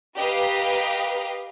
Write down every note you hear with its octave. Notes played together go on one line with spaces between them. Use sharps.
G4 A#4 B4 D#5 F5